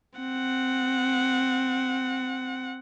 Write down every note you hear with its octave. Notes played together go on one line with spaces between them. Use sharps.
C4 F#5